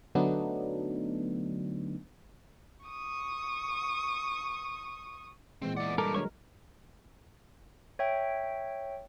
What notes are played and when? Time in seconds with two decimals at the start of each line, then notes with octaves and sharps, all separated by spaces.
0.15 D3 F#3 A3 B3 D4 D#4
2.86 C#6 D#6
5.62 A#2 E3 G#3 C4
5.77 E2 D5 F#5
5.98 G2 A4 A#4 D6
6.15 D3 F#3 G#3 A#4 C#5 C#6
7.99 C#5 E5 G5